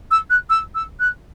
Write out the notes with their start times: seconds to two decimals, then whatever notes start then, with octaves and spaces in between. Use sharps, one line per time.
0.11 E6
0.30 F#6
0.49 E6
0.74 E6
0.99 F#6